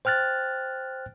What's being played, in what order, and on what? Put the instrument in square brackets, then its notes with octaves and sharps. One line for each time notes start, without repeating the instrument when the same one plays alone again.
[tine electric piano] C5 G5 F6 F#6 A6